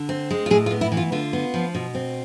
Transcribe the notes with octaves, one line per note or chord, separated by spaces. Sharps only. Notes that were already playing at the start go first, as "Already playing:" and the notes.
Already playing: D3
C4
G#3
F4
A2 G#4
F4
B3
E4
E3
F4
D3 F4
B3
F3
B2
C4